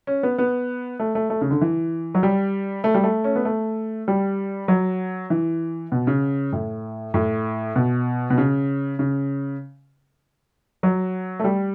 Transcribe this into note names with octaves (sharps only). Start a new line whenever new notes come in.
C#4
B3
B3
A3
A3
A3
C#3
D3
E3
F#3
G3
A3
G3
A3
C#4
B3
A3
G3
F#3
E3
B2
C#3
A2
A2
B2
B2
C#3
C#3
F#3
A3
G3